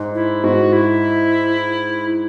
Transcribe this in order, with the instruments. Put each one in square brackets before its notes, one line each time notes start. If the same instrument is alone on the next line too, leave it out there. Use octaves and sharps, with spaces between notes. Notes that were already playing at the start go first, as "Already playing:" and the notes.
Already playing: [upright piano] G#2
[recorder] E4
[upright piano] G#2 [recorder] F#4
[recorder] E4